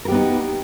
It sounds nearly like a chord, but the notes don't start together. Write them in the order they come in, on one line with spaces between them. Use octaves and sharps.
A#4 G4 B3 D#4